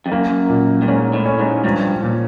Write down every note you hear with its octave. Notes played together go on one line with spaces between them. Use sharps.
F2
F#2 A#3
A#2
G2
G#2 C#4
A2
C#4
G#2
G2 F3
A#2